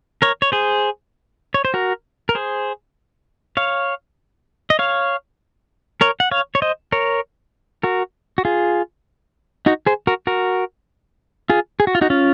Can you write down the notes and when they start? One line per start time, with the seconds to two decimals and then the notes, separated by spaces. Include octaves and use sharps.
0.22 A#4 C#5
0.42 C#5
0.52 G#4 C5
1.54 C#5
1.65 C5
1.74 F#4 A#4
2.29 A#4
2.35 G#4 C5
3.57 C#5 F5
4.70 D#5
4.79 C#5 F5
6.01 A#4 C#5
6.20 F#5
6.31 C#5 F5
6.55 C#5
6.62 C5 D#5
6.92 A#4 C#5
7.83 F#4 A#4
8.38 F#4
8.45 F4 G#4
9.66 D#4 F#4
9.86 G#4 C5
10.07 F#4 A#4
10.27 F#4 A#4
11.50 F4 G#4
11.80 G#4
11.87 F#4
11.95 F4
12.01 D#4 F#4
12.10 C#4 F4